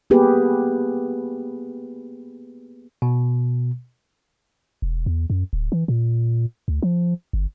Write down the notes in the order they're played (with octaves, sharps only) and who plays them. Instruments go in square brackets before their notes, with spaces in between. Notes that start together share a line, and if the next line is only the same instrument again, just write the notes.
[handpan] A#3 B3 G4 G#4 B4
[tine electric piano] B2
[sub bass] E1
E2
F#2
D1
E3
A#2
D2
F3
G1